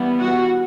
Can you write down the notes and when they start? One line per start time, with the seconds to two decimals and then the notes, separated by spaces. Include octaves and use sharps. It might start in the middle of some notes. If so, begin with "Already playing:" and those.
Already playing: E3 G3 B3
0.18 F#4